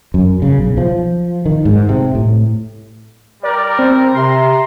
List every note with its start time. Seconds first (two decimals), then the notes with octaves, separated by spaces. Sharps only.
0.14 F#2
0.42 C#3
0.58 B1
0.77 F3
1.46 D#3
1.65 G#2
1.89 C3
2.15 A2
3.43 G3 A#4 D5
3.79 C4
4.15 C3 A#5 C6